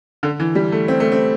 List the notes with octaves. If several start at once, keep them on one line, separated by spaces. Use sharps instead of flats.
D3
E3
G3
A3
C4
A3
C4